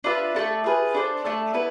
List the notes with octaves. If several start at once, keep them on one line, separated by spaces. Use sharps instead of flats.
D4 F4 B4 E5
A3 E4 A4 D5
F4 G#4 B4
D4 A4 C5
A3 D4 A4
B3 E4 B4